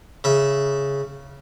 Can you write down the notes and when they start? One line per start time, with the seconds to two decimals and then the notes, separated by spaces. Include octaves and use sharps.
0.24 C#3 E5